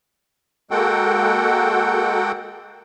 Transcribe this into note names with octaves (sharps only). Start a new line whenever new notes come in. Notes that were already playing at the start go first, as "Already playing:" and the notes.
G#3 A#3 F#4 A4 F#5 G5